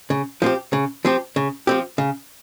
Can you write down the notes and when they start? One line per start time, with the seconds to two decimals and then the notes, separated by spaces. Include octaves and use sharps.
0.10 C#3
0.42 F3 C4 G4
0.73 C#3
1.05 F3 C4 G4
1.36 C#3
1.67 F3 C4 G4
1.98 C#3